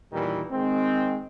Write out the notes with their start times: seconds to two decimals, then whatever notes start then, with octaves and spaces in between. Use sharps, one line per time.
0.13 E2 A#2 D#3 E3 G3
0.51 D#3 G#3 C4